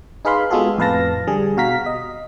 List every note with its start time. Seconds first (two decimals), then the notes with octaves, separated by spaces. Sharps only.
0.25 D#4 G#4 B4 F5 B5 C6
0.50 G#3 B3 F4 F#4 G#4 A4
0.78 F2 A2 B4 F5 A5 A#6
1.27 D3 G3 G#4
1.57 B2 F#4 F5 A#5 B6
1.86 D#5